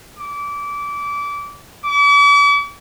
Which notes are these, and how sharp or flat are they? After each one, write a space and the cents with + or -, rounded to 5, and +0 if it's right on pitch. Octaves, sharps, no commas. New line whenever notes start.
D6 -25
D6 -45